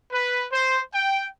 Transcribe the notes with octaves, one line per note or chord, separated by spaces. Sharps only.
B4
C5
G5